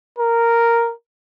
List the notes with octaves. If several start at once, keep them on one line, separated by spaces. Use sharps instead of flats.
A#4